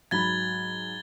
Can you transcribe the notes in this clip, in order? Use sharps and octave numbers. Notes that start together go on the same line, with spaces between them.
G#2 F#3 B5 G#6 A6 G7